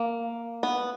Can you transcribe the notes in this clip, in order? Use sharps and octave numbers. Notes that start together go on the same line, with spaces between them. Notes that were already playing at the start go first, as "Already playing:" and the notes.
Already playing: A#3
B3